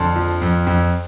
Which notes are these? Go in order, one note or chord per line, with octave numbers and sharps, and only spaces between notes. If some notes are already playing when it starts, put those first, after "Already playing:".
Already playing: F2 D3 A5 C6
F3
F2
F2